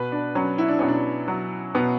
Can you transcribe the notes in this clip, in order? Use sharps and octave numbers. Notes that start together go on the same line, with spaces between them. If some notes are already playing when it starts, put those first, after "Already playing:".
Already playing: B2 B4
D4
F#3 C#4
E4
D4
B2 C#4
D4
F#3
B2 B3